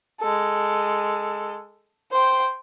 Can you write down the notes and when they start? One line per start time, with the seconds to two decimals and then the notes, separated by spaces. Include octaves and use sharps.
0.20 G#3 A4
2.12 C5 G5